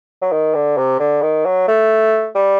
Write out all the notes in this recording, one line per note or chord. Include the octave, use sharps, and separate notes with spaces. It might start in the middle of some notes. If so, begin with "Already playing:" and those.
F#3
D#3
D3
C3
D3
D#3
F#3
A3
G3